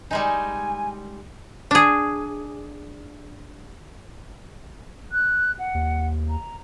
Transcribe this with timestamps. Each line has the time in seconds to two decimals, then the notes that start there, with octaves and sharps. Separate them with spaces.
0.11 G3 G#3 D#4 G#5
1.71 D4 G#4
5.12 F#6
5.59 F#5
5.75 D#2
6.29 A#5